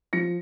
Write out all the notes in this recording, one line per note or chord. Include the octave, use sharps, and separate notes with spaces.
F3 A#6 C#7